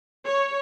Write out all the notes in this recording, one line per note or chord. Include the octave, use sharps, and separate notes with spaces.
C#5